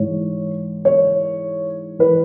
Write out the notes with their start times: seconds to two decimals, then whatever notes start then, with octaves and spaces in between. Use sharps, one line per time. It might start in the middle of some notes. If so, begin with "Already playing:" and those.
Already playing: G#2 E3 C#5
0.85 C#5
1.99 E3 B4